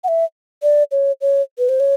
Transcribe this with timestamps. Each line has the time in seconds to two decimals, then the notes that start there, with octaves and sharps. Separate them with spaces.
0.04 F#5
0.08 E5
0.63 D5
0.92 C#5
1.21 C#5
1.58 B4
1.69 C5
1.80 C#5